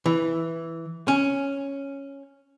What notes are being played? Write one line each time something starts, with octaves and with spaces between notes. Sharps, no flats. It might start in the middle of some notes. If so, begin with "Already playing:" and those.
E3
C#4